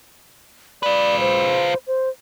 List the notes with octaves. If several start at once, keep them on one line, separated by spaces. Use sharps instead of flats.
F4 B4 D5
C5
C5